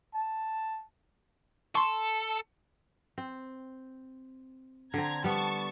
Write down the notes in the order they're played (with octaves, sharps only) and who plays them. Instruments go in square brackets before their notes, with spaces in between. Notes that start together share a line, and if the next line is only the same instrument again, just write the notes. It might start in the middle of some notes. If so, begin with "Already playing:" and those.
[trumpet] A5
[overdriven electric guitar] A4 [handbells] C6 C#6
[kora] C4
[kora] D3 C4 [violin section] A#5 G#6
[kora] G3 B3 [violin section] A5 C#6